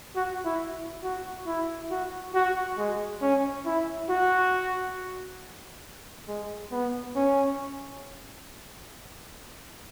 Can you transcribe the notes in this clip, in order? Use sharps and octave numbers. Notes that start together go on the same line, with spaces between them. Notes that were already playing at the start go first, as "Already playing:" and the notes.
F#4
E4
F#4
E4
F#4
F#4
G#3
C#4
E4
F#4
G#3
B3
C#4